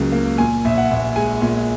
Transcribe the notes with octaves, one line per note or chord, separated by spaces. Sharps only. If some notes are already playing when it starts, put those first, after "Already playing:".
Already playing: C#2 C#3 F#3 A#3
A#3
A#2 G#5
A#1 E5
F#5
A#1
G#3 G#5
A#2